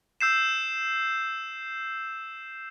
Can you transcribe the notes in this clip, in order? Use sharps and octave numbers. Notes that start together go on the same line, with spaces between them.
E6 G6 C7 E7